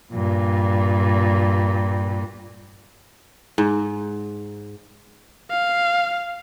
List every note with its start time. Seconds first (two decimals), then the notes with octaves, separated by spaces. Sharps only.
0.13 G2 A#2
3.58 G#2
5.51 F5